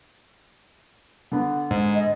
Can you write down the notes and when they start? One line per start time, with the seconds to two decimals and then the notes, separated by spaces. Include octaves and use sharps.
1.32 D3 B3
1.71 G#2
1.95 D#5